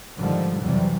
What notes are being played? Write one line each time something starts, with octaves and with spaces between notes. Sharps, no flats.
G#2 D3 D#3 F3 G3
F2 C3 E3 F#3 G3